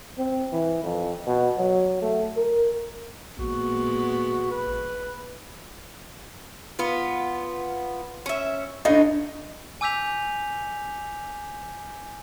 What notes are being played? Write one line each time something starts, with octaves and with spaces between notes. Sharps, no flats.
C4
E3
F2
B2
F#3
A3
A#4
A1 A#2 G#3 B3 F#4
B4
B3 F4
C#4 E5
A2 D4 D#4 D#5
G#5 D6 E6 G6 B6 F7